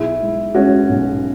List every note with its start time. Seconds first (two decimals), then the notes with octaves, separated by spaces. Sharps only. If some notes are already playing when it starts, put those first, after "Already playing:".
Already playing: B1 E4 G#4
0.21 G#3
0.55 G#3 C#4 F#4
0.89 B1